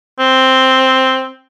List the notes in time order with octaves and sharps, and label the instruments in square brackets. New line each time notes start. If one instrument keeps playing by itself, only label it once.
[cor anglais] C4